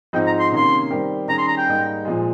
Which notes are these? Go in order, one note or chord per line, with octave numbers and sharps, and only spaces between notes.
G#2 F3 C4 D#4 G5
A#5
C6
C3 D#3 A#3 C#4 C6
D#3 G3 C4 G4 A#4
D#3 G3 C#4 G#4 A#5
C6
A#5
G5
G#2 G3 A#3 D#4
A#2 F3 G#3